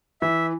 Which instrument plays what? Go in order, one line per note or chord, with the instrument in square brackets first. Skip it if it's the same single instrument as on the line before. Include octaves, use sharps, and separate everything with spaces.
[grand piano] E3 [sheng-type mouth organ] E5